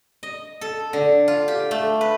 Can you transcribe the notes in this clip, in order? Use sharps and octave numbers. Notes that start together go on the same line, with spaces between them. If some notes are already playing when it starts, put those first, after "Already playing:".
D#5
A4
D3
F4
G4
A3
B4